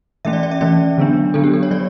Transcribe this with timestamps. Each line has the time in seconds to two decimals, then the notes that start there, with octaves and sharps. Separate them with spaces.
0.25 E3 A3 C#4 E5
0.33 D5
0.43 D5
0.51 E5
0.61 E3 A3 C#4 D5
0.98 D3 F#3 B3 D4
1.34 D3 F#3 B3 D4 A4
1.44 G4
1.54 A4
1.63 C#5
1.71 F#3 D5